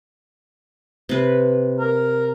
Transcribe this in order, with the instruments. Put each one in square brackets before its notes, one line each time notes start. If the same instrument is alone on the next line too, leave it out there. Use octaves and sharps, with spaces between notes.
[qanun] C3 B4
[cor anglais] A#4